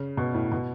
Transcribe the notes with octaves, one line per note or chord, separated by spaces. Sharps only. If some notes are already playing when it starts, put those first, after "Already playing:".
Already playing: C#3
B2
A2
B2